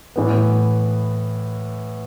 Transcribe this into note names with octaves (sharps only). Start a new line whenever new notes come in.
A2 E3 B3